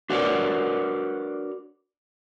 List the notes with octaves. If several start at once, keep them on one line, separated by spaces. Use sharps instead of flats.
D4 F#4 A#4 B4 C#5 D5